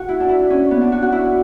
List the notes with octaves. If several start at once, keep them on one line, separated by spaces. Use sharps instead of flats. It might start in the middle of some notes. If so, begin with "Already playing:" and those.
Already playing: F#4
E4
D4
E4
C#4
B3
D4
F#4
F#4
E4